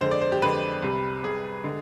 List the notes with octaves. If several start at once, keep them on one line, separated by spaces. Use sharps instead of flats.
F2 D3 G#3 C5
D5
C5
G4
F2 D3 G#3 B4
C2 C3 G3
C2 C3 G3 G#4
D3 G#3